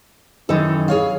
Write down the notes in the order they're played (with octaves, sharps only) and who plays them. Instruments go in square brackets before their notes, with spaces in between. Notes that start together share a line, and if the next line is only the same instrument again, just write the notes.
[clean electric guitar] F#2 D#3 E3 [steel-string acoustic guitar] D#4 A4
[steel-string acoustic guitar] G#4 C#5 F5